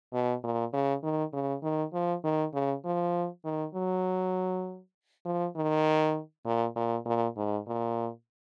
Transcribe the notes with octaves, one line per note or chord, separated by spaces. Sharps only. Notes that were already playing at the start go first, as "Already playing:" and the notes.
B2
A#2
C#3
D#3
C#3
D#3
F3
D#3
C#3
F3
D#3
F#3
F3
D#3
A#2
A#2
A#2
G#2
A#2